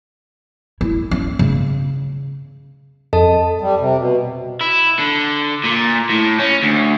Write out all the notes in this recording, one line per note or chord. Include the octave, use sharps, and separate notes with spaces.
E4
C#4
C#3
F2 A4 D#5 A5
G3
C3
B2
E4
D3
A#2
A2
C#4
D2